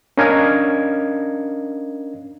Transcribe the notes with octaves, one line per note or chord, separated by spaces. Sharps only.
C#4 D4 A#4 D#5 F5 G#6